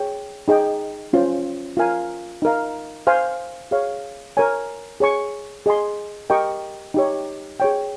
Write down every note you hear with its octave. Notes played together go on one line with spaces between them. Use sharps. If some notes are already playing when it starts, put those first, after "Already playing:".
Already playing: G#4 C#5 G5
D#4 G#4 D#5 G5
C#4 F4 C5
F4 A#4 F5 G#5
D#4 A#4 F5
C5 F5 G#5
G#4 C#5 F5
A#4 C#5 G#5
G#4 C#5 G#5 C#6
G#4 D#5 G#5 C6
G4 A#4 D#5 G5 C#6
D#4 G4 C#5
G#4 C#5 G5